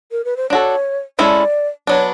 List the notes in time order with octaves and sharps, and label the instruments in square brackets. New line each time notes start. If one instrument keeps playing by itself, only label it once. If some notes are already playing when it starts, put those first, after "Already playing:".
[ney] A#4
B4
C5
[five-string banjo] D4 F#4 A4 [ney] C#5
[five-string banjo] G#3 C#4 E4 A4 [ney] D5
[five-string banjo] F#3 B3 D4 [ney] C#5